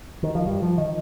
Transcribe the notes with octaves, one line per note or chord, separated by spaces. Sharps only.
D#3
F3
G2 G3
F3
D#3